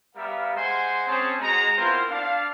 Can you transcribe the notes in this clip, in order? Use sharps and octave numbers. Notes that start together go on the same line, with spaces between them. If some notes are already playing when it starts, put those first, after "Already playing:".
G3 B3 A#4 E5 F5
G#3 C5 F#5 G#5 C6
C4 C#4 G#4 C5 C#5 A5
G#3 F#4 D#5 A#5
B3 C4 E4 F4 A#4 C5
D4 F5